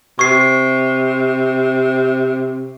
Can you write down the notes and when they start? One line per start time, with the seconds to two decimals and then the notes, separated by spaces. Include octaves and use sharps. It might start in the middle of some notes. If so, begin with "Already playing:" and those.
0.19 C3 C#6 C7